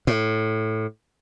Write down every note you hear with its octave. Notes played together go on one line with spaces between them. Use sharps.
A2